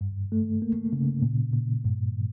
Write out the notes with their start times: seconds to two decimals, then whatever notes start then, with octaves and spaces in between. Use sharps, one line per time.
0.01 G2
0.32 A3
0.62 A#3
0.93 C#3
1.22 A#2
1.54 A#2
1.84 G2